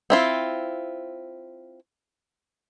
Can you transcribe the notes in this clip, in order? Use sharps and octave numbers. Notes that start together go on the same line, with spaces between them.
C4 E4 F4